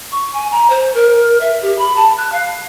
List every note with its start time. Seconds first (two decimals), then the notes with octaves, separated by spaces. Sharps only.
0.12 C#6
0.34 G#5
0.52 A#5
0.70 C5
0.94 A#4
1.41 E5
1.62 G4
1.78 B5
1.96 A5
2.17 F#6
2.32 F5